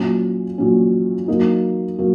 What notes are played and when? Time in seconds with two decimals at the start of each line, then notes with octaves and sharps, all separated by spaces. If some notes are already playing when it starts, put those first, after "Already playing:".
Already playing: A#2 F#3 C#4
0.58 A#2 F#3 C#4
1.28 F#3 A#3 D#4
1.98 F#3 A#3